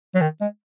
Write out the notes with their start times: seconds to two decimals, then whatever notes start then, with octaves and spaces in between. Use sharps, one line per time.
0.15 F#3
0.21 D#3
0.41 G#3